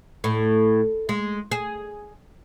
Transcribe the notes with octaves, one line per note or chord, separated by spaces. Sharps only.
A2
G#3
G#4